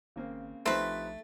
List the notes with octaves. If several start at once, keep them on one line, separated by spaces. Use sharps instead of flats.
G#1 C#3 A#3 C4
A#1 C3 F3 A3 C4 D#4 B4